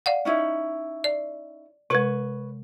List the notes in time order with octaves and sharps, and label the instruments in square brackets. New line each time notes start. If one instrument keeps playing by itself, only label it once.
[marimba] D5 F5 F#5
[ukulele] C#4 D#4 E4
[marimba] D5
[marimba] C3 G#3 [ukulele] B4 C#5